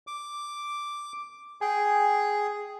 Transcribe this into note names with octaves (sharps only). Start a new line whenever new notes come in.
D6
G#4 G5 G#5